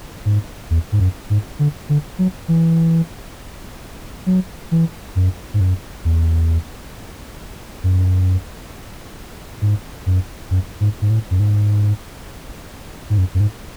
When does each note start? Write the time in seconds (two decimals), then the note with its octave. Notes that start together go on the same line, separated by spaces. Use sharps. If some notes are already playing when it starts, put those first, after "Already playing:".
0.25 G#2
0.70 E2
0.92 G#2
1.00 F#2
1.30 G#2
1.59 D3
1.89 D3
2.19 F#3
2.48 E3
4.26 F#3
4.71 E3
5.16 F#2
5.54 G#2
5.60 F#2
6.05 E2
7.83 F#2
9.62 G#2
10.06 F#2
10.51 F#2
10.80 G#2
11.01 G#2
11.10 A2
11.31 F#2
11.40 G#2
13.10 G#2
13.18 F#2
13.34 F#2
13.40 G#2